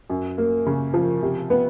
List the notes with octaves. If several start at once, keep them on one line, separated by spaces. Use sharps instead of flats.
F#2
A#3
C#3
F3
C3
B3